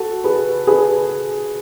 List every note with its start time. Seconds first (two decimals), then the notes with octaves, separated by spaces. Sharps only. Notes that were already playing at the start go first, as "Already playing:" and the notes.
Already playing: F#4 A4
0.24 G#4 B4
0.67 G#4 B4